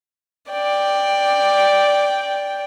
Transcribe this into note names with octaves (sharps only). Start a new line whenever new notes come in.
D5 G5